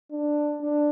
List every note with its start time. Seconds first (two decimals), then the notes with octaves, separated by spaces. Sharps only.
0.11 D4
0.61 D4